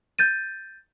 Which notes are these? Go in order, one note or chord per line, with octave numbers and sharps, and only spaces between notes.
G6 A6 D#7